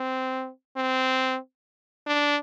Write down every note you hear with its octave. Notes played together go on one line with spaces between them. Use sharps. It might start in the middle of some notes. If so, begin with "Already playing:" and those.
Already playing: C4
C4
D4